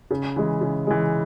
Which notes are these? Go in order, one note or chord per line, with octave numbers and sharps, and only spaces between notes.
C#3
E3 G#3
C#3
E3 G#3